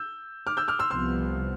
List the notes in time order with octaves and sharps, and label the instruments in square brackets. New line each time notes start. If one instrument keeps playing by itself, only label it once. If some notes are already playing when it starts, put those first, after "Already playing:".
Already playing: [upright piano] E6 G6
D6 F6
E6 G6
D6 F6
C6 E6
[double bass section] C2 C3 F3 B3 [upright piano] C6 E6